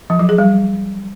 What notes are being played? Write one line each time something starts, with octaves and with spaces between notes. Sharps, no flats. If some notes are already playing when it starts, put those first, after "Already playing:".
F3
F#3
G#4
G3